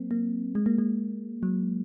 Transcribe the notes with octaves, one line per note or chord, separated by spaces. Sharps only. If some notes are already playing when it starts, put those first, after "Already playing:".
Already playing: F#3 A#3 C4
A#3
G#3
A#3
G#3
F#3